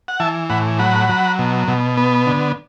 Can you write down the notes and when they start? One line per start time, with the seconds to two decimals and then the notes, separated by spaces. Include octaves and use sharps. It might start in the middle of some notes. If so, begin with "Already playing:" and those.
0.08 F#5
0.20 E3 E5 A5
0.50 A2 F#5 B5
0.79 F#3 F#5 B5
1.09 F#3
1.39 B2
1.68 B2
1.97 B3
2.26 D3